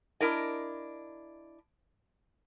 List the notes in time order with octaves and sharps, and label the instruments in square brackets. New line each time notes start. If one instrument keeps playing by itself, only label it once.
[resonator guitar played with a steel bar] D4 E4 A#4 D#5